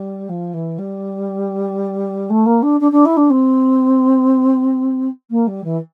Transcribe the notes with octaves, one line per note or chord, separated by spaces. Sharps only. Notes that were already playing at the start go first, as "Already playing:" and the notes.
Already playing: G3
F3
E3
G3
A3
A#3
D4
D4
D4
E4
D4
C4
A#3
G3
E3